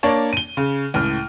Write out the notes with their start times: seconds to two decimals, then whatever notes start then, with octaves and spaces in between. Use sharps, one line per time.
0.03 A#3 D4 C#5 A5
0.33 D#7 G7
0.57 C#3
0.94 C#2 A2 F6